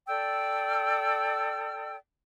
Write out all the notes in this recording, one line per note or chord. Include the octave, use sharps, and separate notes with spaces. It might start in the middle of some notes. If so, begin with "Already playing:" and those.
A4 D5 G5 E6